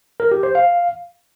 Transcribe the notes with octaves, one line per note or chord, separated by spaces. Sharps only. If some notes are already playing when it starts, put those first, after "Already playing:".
A#4
G4
C5
F5